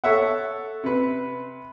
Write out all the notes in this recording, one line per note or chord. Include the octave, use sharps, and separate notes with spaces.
A4 C#5 E5 F#5
C3 B4